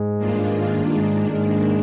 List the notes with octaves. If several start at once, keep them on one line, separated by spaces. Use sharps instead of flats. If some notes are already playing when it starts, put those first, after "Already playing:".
Already playing: G#2 G#3
G2 D#3 A#3 D4 F4
G#2 D#3 G#3 A#3 D4
G#2 G#3